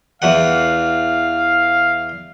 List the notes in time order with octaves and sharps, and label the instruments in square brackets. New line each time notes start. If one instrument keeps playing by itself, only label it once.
[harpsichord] E2 E3 F#5 [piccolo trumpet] F5